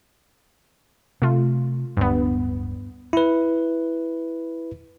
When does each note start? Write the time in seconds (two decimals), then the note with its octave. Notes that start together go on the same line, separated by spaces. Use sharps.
1.22 C3 A3 F4
1.97 D1 G2 B3
3.13 E4 B4